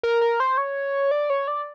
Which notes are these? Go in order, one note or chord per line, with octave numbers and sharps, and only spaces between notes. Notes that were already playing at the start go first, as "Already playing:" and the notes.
A#4
A#4
C5
C#5
D5
C#5
D5